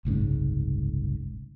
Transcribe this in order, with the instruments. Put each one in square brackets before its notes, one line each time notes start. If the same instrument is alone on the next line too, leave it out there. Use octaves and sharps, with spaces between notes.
[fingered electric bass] F#1 C2 G#2 C#3